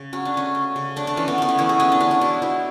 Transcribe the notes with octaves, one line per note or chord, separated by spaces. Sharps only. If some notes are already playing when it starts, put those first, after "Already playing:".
Already playing: C#3
F#3 C#4
D4
A3 C#4
C#3
C#3
A3 D4
D4
E3 C#4
B3
A3 B3
C#4
E3 E4
G#4
G#3 C#4
D4
B3 C#4
D4
B2 E4
B2 E4